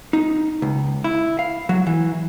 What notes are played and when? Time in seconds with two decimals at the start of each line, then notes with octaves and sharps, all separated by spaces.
0.13 D#4
0.62 C#2
1.04 E4
1.39 F5
1.69 F#3
1.87 E3